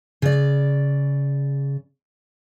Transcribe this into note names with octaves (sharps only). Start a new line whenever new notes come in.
C#3 D5